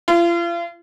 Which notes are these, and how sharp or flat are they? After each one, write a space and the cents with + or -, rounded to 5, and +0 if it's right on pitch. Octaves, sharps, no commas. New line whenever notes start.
F4 -40